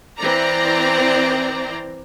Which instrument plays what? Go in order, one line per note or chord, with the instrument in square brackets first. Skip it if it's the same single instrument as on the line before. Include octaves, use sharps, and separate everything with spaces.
[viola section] E3 C4 C5 D5 A#5